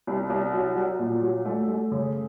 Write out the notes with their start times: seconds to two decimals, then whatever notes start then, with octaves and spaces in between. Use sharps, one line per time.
0.07 C2
0.30 C2
0.53 F#3
0.76 F#3
0.99 A#2
1.22 F#3
1.45 A3
1.68 A3
1.92 C#3